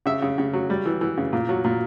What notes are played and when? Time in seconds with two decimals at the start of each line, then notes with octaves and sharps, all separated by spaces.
0.06 C#3 E5
0.22 C#3
0.38 C#3
0.53 F#3
0.70 G3
0.86 E3
1.01 E3
1.17 C#3
1.33 A#2
1.49 F#3
1.64 A#2